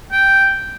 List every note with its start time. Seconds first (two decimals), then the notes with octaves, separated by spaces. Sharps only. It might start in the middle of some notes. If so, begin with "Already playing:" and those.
0.12 G5